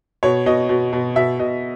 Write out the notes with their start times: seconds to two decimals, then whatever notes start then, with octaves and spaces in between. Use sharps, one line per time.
0.23 B2 C#5
0.46 B2 D#5
0.69 B2
0.93 B2
1.16 B2 E5
1.39 B2 D#5